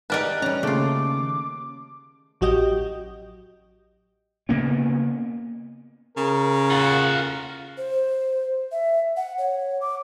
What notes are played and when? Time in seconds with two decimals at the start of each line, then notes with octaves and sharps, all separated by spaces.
0.10 D#4 G4 A#4 B4 D5 A5 F#6
0.42 G3 C#4 A#5
0.63 D#2 C#3 A3 F4 D6
2.41 A1 F#3 F#4 G4 D#5 G6
4.49 C#3 A#3 B3 C#4
6.17 C#3 A#4
6.71 F4 F#5
7.77 C5
8.72 E5
9.17 F#5
9.38 C#5
9.81 D6